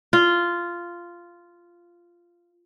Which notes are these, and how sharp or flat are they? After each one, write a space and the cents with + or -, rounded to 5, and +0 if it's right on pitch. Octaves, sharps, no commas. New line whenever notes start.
F4 -10